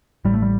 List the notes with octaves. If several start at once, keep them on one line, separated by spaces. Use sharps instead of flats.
A1 A2 G3
A3
G3